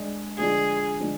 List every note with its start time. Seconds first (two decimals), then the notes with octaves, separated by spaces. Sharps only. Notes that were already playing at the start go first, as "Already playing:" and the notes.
Already playing: G#3 D4 G#4
0.38 D3 F3 G#3 D4 F4 G#4
1.00 D3 F3 G#3 D4